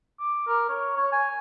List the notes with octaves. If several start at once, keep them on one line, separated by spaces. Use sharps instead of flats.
D6
A#4
C#5
C#5
G#5